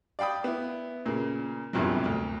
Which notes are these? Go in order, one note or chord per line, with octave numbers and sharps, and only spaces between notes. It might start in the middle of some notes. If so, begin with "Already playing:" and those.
D5 F5 G5 B5 D#6
B3 E4
A#2 C#3
A#1 E2 G2 C3 F3 F#3
D2